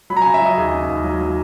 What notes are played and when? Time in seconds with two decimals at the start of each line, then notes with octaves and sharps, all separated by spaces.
0.10 F#3 B5
0.17 A#5
0.22 G#5
0.26 C#3
0.34 E5
0.41 F#3 D#5
0.57 D#2 G#4
0.74 C#3
0.89 D#2
1.04 F#3
1.20 F#3